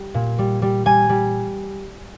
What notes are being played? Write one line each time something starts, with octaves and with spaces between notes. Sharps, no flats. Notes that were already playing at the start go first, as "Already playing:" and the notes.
Already playing: G3
A#2
G3
G3
G3 G#5
G3